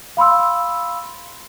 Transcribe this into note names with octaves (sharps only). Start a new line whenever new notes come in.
F5 B5 C6 E6